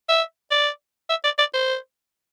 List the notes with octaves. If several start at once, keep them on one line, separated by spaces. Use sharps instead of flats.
E5
D5
E5
D5
D5
C5